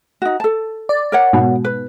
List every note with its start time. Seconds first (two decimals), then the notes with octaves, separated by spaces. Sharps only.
0.22 D#4 F#4
0.40 A4 A5
0.89 D5
1.12 A#4 C#5 F#5
1.33 G#2 B2
1.65 B4